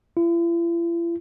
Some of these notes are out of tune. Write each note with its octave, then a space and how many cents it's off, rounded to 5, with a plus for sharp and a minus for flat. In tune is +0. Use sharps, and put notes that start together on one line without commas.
E4 +45